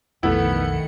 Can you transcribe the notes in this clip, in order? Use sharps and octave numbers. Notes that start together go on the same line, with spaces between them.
B1 F2 D#3 A3 B3 E4 C#7